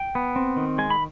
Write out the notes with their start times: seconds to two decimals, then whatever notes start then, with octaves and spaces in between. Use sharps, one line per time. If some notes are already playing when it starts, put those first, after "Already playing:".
Already playing: G5
0.15 B3
0.36 C4
0.57 D#3
0.78 G#3 G#5
0.90 B5